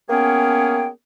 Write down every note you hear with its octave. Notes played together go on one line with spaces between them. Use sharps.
A#3 B3 C#4 G#4 C#5 G5